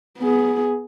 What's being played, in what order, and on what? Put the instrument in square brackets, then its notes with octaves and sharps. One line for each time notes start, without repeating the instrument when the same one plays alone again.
[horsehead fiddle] B3 G#4